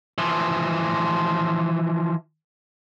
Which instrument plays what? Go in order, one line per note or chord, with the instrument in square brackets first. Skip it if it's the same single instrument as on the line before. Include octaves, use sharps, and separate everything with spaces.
[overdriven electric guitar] E3 F3